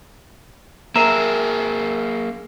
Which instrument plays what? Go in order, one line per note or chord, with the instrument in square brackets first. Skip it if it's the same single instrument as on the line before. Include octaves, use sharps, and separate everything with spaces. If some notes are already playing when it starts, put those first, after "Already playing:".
[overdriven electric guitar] A#3 G#4 [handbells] A#4 A#5 [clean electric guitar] E5